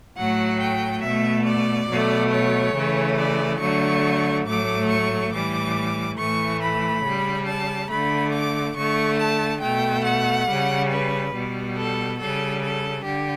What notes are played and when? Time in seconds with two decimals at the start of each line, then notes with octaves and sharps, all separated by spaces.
0.16 A2 F#3 A3 F#5
0.59 G5
1.02 B2 A3 E5
1.45 D5
1.88 B2 F#3 A3
2.31 C#5
2.74 C#3 E3 A3
3.17 D5
3.60 D3 F#3 A3 C#6
4.45 A2 F#3 A3 D6
4.89 C#6
5.31 A2 E3 G3 D6
6.17 A2 E3 A3 C#6
6.61 B5
7.03 C#3 G3
7.47 A5
7.89 D3 A3 B5
8.32 D6
8.76 D3 A3 C#6
9.18 A5
9.61 B2 A3 G5
10.04 F#5
10.48 C#3 G3
10.90 B4
11.33 B2 G3
11.76 A4
12.19 C#3 G3 A4
12.62 A4
13.05 D3 G4